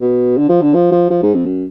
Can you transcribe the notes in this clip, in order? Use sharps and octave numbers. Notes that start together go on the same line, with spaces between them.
B2
D3
F3
D3
F3
F3
F3
G#2
F2
F#2